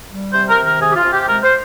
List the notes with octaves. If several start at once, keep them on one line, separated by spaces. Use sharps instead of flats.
G3
C3 C5
A#4
D#3
A#4
C3 G#4
G4
F4
C3
G4
G#3 A#4
C5